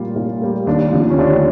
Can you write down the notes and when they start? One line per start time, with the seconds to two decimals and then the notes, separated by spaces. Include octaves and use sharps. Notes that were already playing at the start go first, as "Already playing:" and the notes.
Already playing: A#2 G3 A#3 F4 G4
0.16 A#2
0.41 G3 A#3
0.67 D#2 D4
0.92 D3 F3
1.10 C#4
1.18 D#2 D4